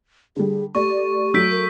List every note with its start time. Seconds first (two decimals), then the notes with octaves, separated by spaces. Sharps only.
0.36 D3 G3 G#4
0.75 A3 G4 D5 C#6
1.34 F#3 A3 E6 G6 B6 D7
1.51 A#4